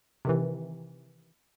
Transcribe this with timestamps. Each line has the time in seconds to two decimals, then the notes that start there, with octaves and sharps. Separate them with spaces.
0.25 C3 D#3 E3